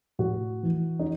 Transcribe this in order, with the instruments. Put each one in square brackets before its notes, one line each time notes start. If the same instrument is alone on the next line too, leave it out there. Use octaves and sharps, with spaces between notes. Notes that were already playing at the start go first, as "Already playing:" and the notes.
[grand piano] A2 F#4
E3
D#4